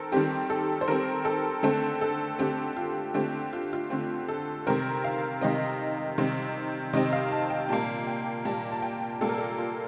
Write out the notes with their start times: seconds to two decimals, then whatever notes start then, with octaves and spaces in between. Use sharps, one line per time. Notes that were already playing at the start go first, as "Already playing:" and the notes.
Already playing: D#3 C4 A4 A#4 C5
0.12 D#3 G3 C4 G4
0.50 A4
0.81 C5
0.88 D#3 G3 C4 A#4
1.25 A4
1.63 D3 A3 C4 A4
2.01 A4
2.39 D3 A3 C4 G4
2.76 F4
3.14 D3 A3 C4 G4
3.53 F4
3.73 F4
3.90 D3 A3 C4
4.28 A4
4.67 C3 D#3 G3 C4 A#4
5.04 F5
5.41 C3 D#3 G3 C4 D#5
6.18 C3 D#3 G3 C4
6.93 C3 D#3 G3 C4 D#5
7.13 F5
7.32 A5
7.50 G5
7.69 A#2 G3 A#3 A5
8.07 G5
8.45 A#2 G3 A#3 A5
8.72 A5
8.82 G5
9.21 A#2 G3 A#3 A4
9.29 A#4
9.38 A4
9.58 F4